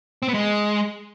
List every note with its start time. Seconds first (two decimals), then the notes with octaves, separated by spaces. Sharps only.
0.22 C4
0.28 B3
0.34 G#3